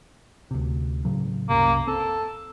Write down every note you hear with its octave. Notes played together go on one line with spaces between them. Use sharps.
D2 C3
A2 C#3 F#3
C2 F#2 C3 A#3
C4 A4